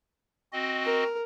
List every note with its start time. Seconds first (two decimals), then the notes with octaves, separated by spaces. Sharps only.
0.53 C4 F#4 D#5
0.84 A#4